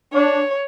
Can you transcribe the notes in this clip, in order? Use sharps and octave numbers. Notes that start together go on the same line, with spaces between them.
D4 C#5